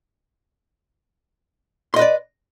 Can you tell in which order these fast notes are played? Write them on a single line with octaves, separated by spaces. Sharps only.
C6 D#5 B4 D5